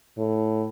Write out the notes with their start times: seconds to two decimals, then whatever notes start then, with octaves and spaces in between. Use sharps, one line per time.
0.18 A2